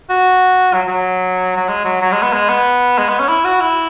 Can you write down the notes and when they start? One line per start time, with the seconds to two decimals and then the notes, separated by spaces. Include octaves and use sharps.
0.10 F#4
0.74 F#3
0.87 F#3
1.57 F#3
1.69 G#3
1.84 F#3
2.02 F#3
2.12 G#3
2.22 B3
2.33 G#3
2.49 B3
2.98 G#3
3.09 B3
3.19 C#4
3.28 E4
3.45 F#4
3.60 E4